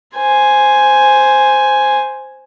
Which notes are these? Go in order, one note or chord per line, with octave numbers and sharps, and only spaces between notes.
C5 G#5